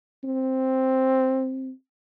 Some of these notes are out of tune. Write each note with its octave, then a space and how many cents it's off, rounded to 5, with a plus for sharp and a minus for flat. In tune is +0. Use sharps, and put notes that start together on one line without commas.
C4 +5